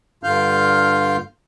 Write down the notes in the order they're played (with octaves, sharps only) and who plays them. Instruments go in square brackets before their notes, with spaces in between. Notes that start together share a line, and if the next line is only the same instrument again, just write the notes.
[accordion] G2 D3 F4 F5 F6 G6